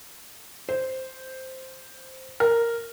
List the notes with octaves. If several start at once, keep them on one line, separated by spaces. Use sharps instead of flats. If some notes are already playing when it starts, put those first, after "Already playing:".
C5
A#4